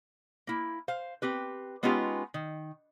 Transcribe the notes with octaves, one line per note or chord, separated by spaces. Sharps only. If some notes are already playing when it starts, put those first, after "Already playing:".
A#3 E4
C5 F5
C4 G4 B4
G#3 B3 C#4 D#4 F4 G4
D#3